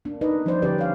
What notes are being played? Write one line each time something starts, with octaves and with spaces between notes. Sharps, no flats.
A#3 D4
D#4 B4 D5 D#5
F3 G3 C#4 D#4 C5 D5
D3 C#4 G4 B4 D5
C#5 F5